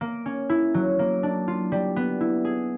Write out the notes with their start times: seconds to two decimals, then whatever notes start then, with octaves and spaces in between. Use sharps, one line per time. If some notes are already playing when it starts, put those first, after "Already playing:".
0.01 A#3
0.26 C#4
0.49 E4
0.74 F#3
0.99 A#3
1.23 D4
1.48 F4
1.72 G3
1.96 B3
2.21 E4
2.45 G#4